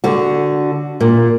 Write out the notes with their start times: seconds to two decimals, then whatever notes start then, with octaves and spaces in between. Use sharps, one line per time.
0.04 D3 F#4
1.00 A#2